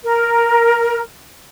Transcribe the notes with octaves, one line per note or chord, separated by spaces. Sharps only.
A#4